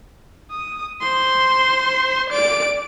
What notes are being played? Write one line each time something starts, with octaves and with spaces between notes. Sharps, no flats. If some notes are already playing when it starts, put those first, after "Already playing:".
D#6
C5 C6
D5 D7